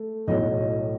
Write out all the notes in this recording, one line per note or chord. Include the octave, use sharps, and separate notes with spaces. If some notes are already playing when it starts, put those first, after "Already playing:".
Already playing: A3
B1 A2 F#3 A3 D#5